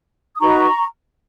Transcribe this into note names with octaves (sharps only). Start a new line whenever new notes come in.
D#6
D#4 F#4 B4 A#5 C#6